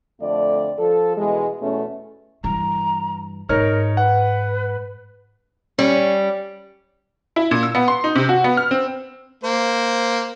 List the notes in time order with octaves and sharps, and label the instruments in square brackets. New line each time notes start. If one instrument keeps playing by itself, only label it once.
[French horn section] F2 D3 A3 D5
F3 A4
B2 E3 G#3
E2 B2 A3 C#4
[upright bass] G2 E3 [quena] A#5
[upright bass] G#2 [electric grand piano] D#4 C#5 F6 [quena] A#4
[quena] B4 [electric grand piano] F#5
[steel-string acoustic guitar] G3 [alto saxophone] C#4
[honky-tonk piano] E4
A#2
E6
B3
C6
D#4
C3
F#4
B3
F6
C4
[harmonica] A#3 C5